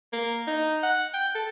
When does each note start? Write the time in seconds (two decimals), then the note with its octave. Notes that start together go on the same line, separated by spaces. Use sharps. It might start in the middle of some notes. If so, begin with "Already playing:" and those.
0.13 A#3
0.47 D#4
0.83 F#5
1.14 G5
1.35 A4